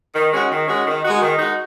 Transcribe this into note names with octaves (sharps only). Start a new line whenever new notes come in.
D#3
G#3 C#4 F#4
D#3
G#3 C#4 F#4
D#3
G#3 D#4 F#4
D#3
G#3 D#4 F#4